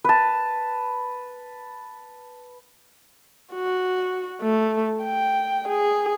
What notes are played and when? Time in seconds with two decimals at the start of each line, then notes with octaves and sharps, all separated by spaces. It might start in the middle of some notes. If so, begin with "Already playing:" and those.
0.04 B4 A5
3.54 F#4
4.42 A3
5.04 G5
5.69 G#4